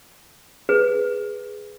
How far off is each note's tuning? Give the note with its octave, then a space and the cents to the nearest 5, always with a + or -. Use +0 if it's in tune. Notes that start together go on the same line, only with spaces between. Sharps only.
G#4 +0 B4 +0